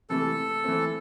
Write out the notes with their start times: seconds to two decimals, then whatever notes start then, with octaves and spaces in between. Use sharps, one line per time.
0.10 C3 E3 A3 A4
0.64 E3 A3 C4